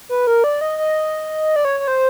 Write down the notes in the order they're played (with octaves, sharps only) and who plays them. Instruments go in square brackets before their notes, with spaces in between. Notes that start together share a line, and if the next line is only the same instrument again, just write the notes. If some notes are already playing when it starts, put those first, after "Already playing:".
[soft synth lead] B4
A#4
D5
D#5
D#5
D5
C#5
C#5
C5